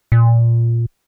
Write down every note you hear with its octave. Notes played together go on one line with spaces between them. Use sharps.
A#2